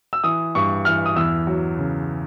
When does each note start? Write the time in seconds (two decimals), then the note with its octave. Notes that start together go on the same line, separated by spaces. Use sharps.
0.13 E6
0.24 E3 D#6
0.55 G2 C#6
0.85 E3 F6
1.06 D#6
1.16 E2 E6
1.47 F#3
1.78 C#3